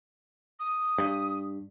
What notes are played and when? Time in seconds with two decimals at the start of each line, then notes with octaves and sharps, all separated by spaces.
0.60 D#6
0.98 G2